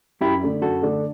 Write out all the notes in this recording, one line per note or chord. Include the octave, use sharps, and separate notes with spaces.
F#2 E4 G4
D3 A3 D4
F#2 F#4 A4
D3 A3 D4